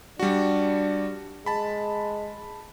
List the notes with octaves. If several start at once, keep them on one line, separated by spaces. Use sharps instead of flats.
G3 D4 F#4
G#3 A5 B5